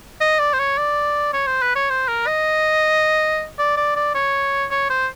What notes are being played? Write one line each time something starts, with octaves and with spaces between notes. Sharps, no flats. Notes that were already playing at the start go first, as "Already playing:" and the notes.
D#5
D5
C5
C#5
D5
C#5
C5
B4
C#5
C5
A#4
D#5
D5
D5
D5
C#5
C#5
C5